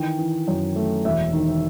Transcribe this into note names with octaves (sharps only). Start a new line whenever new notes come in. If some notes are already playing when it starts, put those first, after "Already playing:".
Already playing: D#3 E3 G5
E3
F#2
A3
E1 E5
D#3